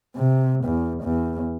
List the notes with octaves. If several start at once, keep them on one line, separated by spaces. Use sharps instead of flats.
C3
E2
E2